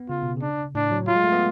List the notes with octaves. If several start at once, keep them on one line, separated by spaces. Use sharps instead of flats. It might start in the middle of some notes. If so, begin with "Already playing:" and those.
Already playing: B3
C#3 F4
B2
C#3
D4
A2 D4
F#3
F#3 F4
G#3
A3
B3